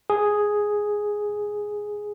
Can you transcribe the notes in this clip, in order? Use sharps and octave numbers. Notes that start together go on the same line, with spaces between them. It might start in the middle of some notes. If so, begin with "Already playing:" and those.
G#4